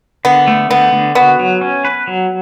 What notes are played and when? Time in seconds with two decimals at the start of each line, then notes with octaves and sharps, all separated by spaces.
0.25 D3 B3
0.47 A3
0.70 D3 B3
0.93 D3
1.15 B3 F#4
1.39 F#3
1.61 C#4
1.85 B4
2.07 F#3